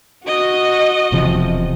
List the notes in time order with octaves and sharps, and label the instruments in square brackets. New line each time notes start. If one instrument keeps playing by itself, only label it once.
[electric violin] F#4 D#5
[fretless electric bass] E1 C3 F3